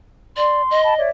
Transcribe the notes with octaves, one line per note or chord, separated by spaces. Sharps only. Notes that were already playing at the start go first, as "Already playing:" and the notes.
D5 C6
D#5
G5 A5 B5
C#5 D5 E5